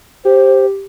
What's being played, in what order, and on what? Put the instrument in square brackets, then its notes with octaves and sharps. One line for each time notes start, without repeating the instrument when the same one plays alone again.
[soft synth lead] G4 [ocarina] C5